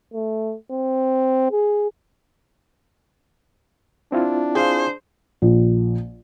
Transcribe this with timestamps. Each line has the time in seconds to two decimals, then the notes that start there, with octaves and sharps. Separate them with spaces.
0.14 A3
0.71 C4
1.51 G#4
4.12 C4 D4 E4 F4
4.55 G#4 C5 F5
5.42 A#1